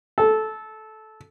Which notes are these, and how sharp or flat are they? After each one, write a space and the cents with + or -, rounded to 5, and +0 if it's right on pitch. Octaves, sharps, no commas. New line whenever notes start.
A4 -15